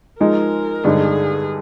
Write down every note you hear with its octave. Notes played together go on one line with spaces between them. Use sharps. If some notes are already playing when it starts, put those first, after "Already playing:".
F3 G#3 D#4 A#4
G2 D3 G#3 D#4 G#4